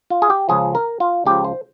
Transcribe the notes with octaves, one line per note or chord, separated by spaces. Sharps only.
F4
G#4
G4
C#2 C#3 F3 G#4
A#4
F4
C#2 C#3 F3 G4
C5